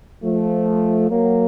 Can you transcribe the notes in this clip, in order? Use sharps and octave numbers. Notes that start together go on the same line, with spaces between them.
F3 A3
F#3 A#3